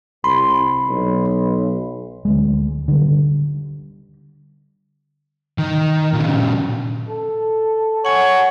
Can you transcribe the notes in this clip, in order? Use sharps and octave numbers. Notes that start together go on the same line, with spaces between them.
C2 B5 C6
B1
D2 G#3
D3 G3
D#3
A#2 C#3
A4
C#5 F#5 G#5